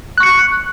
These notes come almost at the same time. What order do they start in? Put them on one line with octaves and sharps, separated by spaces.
F#6 C#6 C#7